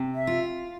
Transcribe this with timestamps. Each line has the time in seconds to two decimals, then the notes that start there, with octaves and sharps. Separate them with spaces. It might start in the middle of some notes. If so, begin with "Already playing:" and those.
Already playing: C3
0.15 E5
0.27 F4